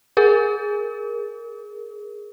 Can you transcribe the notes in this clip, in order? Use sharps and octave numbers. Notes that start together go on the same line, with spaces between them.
G#4 A#4